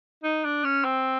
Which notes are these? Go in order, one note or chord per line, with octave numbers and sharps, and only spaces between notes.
D#4
D4
C#4
C4